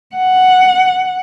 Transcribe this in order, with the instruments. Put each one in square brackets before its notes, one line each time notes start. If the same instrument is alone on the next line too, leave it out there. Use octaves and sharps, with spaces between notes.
[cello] F#5